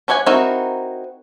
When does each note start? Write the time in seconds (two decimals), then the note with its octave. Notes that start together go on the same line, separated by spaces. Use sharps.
0.08 D4 G4 C#5 F#5 G#5
0.26 C4 D#4 E4 F#4 A#4